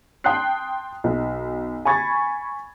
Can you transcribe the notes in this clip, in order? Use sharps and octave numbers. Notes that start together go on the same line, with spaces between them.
G5 A5 C6 D#6 F#6 C7
B1
G#5 B5 C#6 G#6 A6